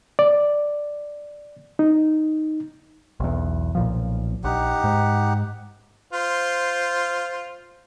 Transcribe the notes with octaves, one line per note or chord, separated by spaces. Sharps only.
D5
D#4
B1 E2
B1 A#2 F3
A#1 D#4 G4 F#5
G#2
F4 C5